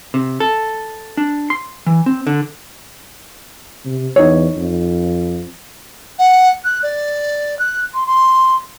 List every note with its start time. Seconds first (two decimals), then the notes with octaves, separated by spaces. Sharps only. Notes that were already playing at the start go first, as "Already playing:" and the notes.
0.14 C3
0.40 A4
1.17 D4
1.50 C6
1.86 E3
2.06 C4
2.27 D3
3.85 C3
4.16 E2 D#4 C#5
4.57 F2
6.19 F#5
6.64 F#6
6.83 D5
7.59 F#6
7.94 C6
8.06 C6